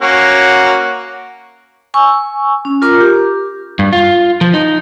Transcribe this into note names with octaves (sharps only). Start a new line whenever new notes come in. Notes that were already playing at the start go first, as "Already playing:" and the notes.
A#3 C#4 F#4
G#5 C#6 E6
C#4
F4 A#4 A#5 D6
G4
G2
F4
F3
D#4